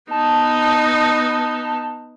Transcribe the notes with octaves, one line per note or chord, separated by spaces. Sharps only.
B3 D#4 A5